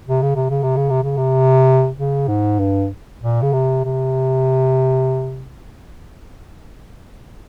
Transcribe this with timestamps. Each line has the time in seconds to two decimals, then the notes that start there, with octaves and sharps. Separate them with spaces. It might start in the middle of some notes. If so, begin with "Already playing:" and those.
0.09 C3
0.22 C#3
0.36 C3
0.50 C#3
0.63 C3
0.77 C#3
0.90 C3
1.03 C#3
1.17 C3
1.97 C#3
2.28 G#2
2.59 G2
3.22 A#2
3.42 C#3
3.53 C3
3.84 C3